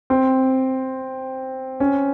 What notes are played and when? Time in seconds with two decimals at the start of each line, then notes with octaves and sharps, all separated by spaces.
0.10 C4
1.80 C#4